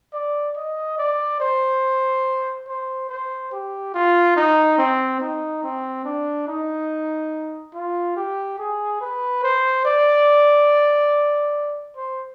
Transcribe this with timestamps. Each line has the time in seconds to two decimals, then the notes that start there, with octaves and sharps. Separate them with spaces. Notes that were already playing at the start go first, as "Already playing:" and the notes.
0.13 D5
0.56 D#5
0.98 D5
1.40 C5
2.67 C5
3.09 C5
3.52 G4
3.94 F4
4.36 D#4
4.78 C4
5.20 D#4
5.63 C4
6.05 D4
6.48 D#4
7.74 F4
8.16 G4
8.58 G#4
9.01 B4
9.43 C5
9.85 D5
11.96 C5